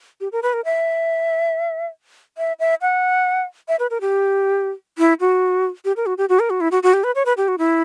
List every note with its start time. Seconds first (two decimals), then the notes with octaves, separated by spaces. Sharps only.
0.21 G4
0.32 A#4
0.43 B4
0.53 A#4
0.65 E5
2.38 E5
2.59 E5
2.81 F#5
3.68 E5
3.79 B4
3.90 A#4
4.01 G4
4.98 E4
5.20 F#4
5.85 G4
5.96 A#4
6.06 F#4
6.18 G4
6.29 F#4
6.39 A#4
6.50 F#4
6.61 E4
6.71 F#4
6.83 F#4
6.93 G4
7.04 B4
7.15 C#5
7.25 B4
7.37 G4
7.48 F#4
7.58 E4